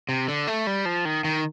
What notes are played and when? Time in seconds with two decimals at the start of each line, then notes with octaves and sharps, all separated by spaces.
0.09 C3
0.28 D3
0.47 A3
0.67 G3
0.85 F3
1.05 D#3
1.24 D#3